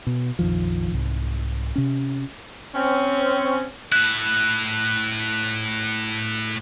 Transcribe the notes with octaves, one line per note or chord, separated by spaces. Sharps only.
B2
A#1 F2 D#3 F3
C2 G#2
C3 C#4
C4 C#4
A2 E4 F#6